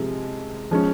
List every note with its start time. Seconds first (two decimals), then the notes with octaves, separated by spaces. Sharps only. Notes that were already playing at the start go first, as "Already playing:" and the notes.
Already playing: C3 F3 G#3
0.71 F3 G#3 C#4